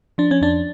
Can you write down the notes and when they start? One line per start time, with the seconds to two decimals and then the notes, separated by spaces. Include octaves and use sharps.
0.18 F3 D4
0.31 C#4
0.41 F2 D4